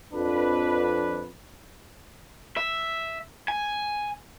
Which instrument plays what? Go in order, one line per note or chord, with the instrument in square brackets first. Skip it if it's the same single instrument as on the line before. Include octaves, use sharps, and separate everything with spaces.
[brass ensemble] F2 D4 B4
[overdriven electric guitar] E5
G#5